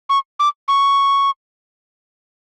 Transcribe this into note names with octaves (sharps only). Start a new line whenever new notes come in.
C#6
D6
C#6